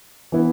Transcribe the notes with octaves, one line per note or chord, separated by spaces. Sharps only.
E3 B3 E4